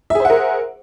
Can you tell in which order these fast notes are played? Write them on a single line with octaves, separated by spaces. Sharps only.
E5 G#4 C5 F#5 A#4